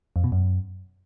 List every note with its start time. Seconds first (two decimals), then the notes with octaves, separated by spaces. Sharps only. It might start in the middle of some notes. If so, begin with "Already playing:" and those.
0.16 F2
0.24 B2
0.32 F#2